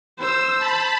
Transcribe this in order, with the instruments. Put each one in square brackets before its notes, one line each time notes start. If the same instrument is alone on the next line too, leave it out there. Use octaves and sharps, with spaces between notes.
[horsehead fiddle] C5 [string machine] E6
[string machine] A5 B5